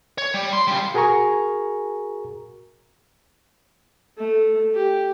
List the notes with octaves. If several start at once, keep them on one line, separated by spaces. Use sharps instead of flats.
C#5
G3
C6
C#3 G3
F#4 G#4 A#4 G#5 A#5 C#6
A3
G4